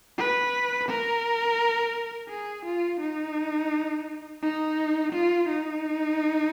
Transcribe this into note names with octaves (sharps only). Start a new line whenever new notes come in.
B4
A#4
G#4
F4
D#4
D#4
F4
D#4